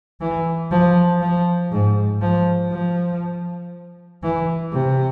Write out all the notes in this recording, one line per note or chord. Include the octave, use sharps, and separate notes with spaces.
E3
F3
F3
G#2
F3
F3
E3
C3